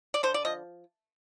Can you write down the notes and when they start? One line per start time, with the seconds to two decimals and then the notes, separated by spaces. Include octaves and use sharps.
0.14 D5
0.23 D3 C5
0.34 D5
0.45 F3 D#5